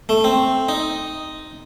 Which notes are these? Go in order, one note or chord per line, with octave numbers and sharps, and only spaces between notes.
A3
C4
D#4